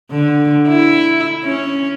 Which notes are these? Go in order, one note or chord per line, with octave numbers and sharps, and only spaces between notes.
D3
E4
C#4